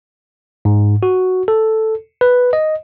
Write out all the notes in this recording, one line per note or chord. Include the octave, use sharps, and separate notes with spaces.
G#2
F#4
A4
B4
D#5